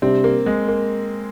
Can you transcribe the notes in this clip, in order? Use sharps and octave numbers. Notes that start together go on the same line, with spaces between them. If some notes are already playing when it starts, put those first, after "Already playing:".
C3 G3 C4 D4
A#3
G#3
A#3